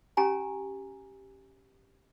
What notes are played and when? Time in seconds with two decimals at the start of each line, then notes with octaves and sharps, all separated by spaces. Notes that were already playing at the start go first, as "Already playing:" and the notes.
0.17 C#4 G4 G#5 A#5